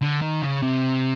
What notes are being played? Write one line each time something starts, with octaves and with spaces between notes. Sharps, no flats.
D3
D#3
C#3
C3